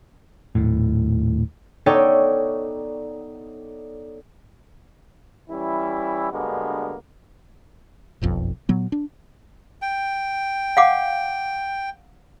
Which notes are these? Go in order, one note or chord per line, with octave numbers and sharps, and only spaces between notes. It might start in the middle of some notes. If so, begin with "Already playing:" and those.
D#1 A2
B3 D#4 A4 C#5 D5 G5
E3 G3 C#4 E4
G2 D3 G#3 A#3 B3 F#4
F#1 B1 F2
A#2 F#3 B3
D4
G5
F5 F#5 D6